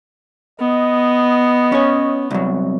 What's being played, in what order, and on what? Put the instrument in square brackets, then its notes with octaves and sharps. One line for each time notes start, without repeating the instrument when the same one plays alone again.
[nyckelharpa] B3 [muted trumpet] D#5
[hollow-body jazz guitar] C#4 C#5
C2 F#3